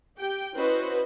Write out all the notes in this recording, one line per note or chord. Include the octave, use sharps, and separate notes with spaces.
G4 G5
C#4 E4 F#4 B4 C5 D#5